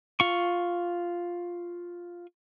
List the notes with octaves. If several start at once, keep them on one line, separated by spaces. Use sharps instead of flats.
F4 C#6